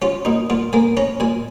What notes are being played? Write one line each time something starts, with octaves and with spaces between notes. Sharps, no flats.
C#4 F4
A#2 D#4
A#2 F4
A#3 G#5
C#4 A#5
A#2 G#5